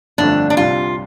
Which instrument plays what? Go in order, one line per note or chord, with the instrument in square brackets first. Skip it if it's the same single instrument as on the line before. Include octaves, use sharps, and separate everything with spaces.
[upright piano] G1 F2 D3 F3 A3 [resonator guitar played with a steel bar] D4
[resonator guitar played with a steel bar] D4
[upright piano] C2 C3 G3 [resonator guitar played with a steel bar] F4